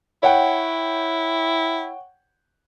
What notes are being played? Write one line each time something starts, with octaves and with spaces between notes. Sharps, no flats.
E4 C#5 F#5 G5